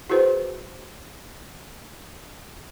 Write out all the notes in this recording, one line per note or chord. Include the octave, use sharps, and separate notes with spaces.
E4 F#4 G#4 B4 C5